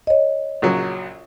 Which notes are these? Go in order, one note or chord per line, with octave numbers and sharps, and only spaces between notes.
C#5 D#5
A#1 C#3 F#3